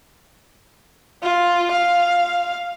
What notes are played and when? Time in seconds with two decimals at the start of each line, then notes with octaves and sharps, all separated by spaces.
1.23 F4
1.72 F5